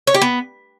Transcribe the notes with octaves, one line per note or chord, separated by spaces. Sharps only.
C#5
G4
B3